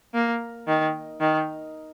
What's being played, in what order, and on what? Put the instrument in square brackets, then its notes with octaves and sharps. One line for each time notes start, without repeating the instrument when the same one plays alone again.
[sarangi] A#3
D#3
D#3